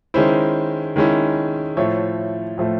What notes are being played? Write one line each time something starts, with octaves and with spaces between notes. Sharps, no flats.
D#3 G#3 C#4 E4 C5
D#3 G#3 C#4 E4
A2 F3 A3 C#5
A2 F3 A3